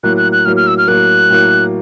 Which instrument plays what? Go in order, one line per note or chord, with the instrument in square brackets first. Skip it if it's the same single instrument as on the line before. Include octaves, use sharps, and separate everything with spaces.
[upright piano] A2 F#3 A#3 [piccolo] F#6
[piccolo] F#6
F#6
[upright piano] A2 F#3 A#3 [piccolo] F6
[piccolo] F6
E6
F6
[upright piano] A2 F#3 A#3 [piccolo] F#6
[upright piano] A2 F#3 A#3